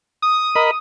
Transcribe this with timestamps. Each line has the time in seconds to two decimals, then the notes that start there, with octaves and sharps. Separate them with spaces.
0.22 D#6
0.55 A#4 D#5 B5